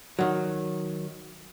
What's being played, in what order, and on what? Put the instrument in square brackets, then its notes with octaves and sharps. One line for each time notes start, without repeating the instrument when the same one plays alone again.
[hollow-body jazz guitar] D#3 F#3